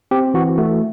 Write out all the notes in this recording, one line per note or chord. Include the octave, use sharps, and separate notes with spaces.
C4 G4
E3 F#4
A3 F#4